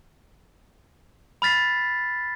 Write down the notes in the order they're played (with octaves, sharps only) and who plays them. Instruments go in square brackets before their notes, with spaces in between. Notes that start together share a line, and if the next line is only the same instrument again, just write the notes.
[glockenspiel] B5 F6 A6 B6 C7